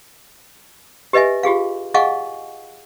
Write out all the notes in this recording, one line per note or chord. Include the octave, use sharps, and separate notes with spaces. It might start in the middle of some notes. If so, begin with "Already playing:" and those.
G4 B4 D#5 E5 G#5
F4 G4 G#4 F5
G#4 D#5 F5 F#5 G#5 C#6